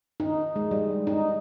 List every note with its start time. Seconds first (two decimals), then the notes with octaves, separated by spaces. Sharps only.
0.20 D#4
0.56 G#3
0.71 G3
1.07 D#4